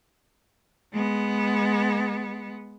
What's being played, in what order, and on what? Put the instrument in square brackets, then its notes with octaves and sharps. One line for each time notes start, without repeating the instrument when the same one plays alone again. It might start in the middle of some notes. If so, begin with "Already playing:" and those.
[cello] G#3 B3